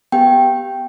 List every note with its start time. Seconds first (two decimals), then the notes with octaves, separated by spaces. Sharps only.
0.12 B3 G4 G5